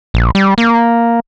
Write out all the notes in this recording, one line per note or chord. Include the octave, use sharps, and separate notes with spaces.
A#1
G3
A#3